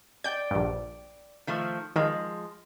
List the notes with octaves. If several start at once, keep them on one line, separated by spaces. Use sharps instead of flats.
D5 G5 G6
A#1 G2
D#3 F3 A3
D#3 F3 G#3